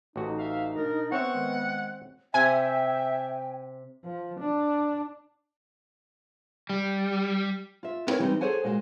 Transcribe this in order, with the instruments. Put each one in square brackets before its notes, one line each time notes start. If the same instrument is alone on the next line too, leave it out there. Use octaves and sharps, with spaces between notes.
[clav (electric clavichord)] A1 F#4 [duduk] D#4
[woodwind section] E5 F5
B2 D4 A#4
[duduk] B3 [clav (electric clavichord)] C4 C#5 E5 [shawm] F#5 [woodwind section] C#6
[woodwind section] D#3 G#3
[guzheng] C3 [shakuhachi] E5 [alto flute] G5 [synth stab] G#5
[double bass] F3
D4
[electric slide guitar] G3
[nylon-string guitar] F4 E5
B3 C4 E4 A#4 B4 C#5
E3 F#3 G3 A#3 C4 D#4
G#4 A4 C5 C#5 F#5 G#5
A#2 G#3 F#4